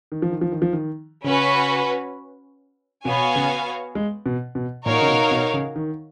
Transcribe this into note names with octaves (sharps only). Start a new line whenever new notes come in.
D#3
F3
D#3
F3
D#3
F3
D#3
C#3 C#4 F#4 B4
B2 B3 F#4 C#5 F5 G#5
C#3
G#3
B2
B2
A#2 D#4 F#4 A#4 C#5 F5
C#3
B2
B2
C#3
D#3